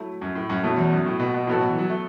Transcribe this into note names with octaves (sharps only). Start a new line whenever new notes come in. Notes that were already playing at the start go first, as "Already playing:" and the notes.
Already playing: F#3 A3 E4
F#2
A2
F#2
F#2 B2 F#3 A3 E4 A4
E2
F#2
A2
B2
B2
A2 F#3 B3 F#4 A4
B2
E3
F#3
A3